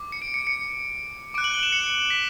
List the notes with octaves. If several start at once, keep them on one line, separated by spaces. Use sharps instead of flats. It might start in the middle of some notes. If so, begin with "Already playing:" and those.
Already playing: D6
C#7
D7
C#7
C#7
D6 F#6 D7
F#7
G7
E7
C#7
B6